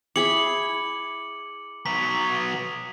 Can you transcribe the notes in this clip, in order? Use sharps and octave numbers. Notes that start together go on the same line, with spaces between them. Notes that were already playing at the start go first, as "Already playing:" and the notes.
E4 G#4 B5 D6 C#7 F#7
F#3 B3 B6